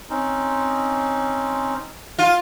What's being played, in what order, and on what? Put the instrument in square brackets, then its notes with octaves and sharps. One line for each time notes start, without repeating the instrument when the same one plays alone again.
[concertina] C4 C#4 D#4
[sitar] F4